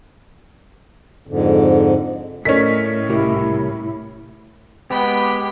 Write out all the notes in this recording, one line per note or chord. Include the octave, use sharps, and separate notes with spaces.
F2 G#2 D3
A2 C#4 A4 A#4 D5 D#5 B6
C2 E4 G4 A#4
G#3 B3 G4 G5 B5